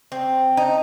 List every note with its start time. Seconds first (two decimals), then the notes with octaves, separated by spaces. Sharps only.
0.12 C4
0.57 D#4